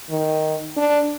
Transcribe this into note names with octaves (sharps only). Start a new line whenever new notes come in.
D#3
D4